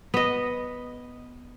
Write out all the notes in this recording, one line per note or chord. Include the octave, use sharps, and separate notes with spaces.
B3 D#5